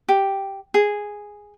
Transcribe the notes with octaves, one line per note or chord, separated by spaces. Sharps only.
G4
G#4